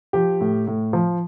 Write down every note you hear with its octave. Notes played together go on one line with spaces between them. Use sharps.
F3 G4
A2
A2
F3